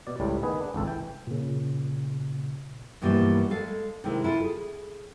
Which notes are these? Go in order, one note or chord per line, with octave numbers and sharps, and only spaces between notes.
B2 D5
C#2 A2 G3
D#3 B3 G#4 B4
D4
G#1 C#2 A4
E3 G5
A#2 C#3
G2 B2 E3 F3 G3 A#3
G#3 A4 F5
C3 D#3 G#3 E4
E4 F4 A4
G#4